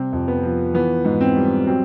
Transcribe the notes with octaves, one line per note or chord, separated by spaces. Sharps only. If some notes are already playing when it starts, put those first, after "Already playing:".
Already playing: C3 G3 C4
F2
B3
F3
E3 B3
G#2
C4
G3
F#3 C4